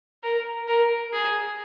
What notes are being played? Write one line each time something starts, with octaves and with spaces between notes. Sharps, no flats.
A#4
A#4
G#4